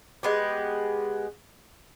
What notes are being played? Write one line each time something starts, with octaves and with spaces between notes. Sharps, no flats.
G#3 B3 G4